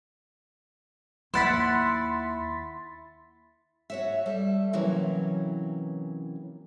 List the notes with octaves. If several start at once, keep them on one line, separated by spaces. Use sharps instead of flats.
D#2 E4 F#5 C6 A6 B6
F#4 C#5 E5
G3 A4 E5
C3 E3 F#3 A#3 C#4